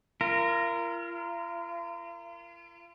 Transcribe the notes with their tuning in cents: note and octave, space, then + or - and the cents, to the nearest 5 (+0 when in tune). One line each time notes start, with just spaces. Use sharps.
F4 -40 A#4 +0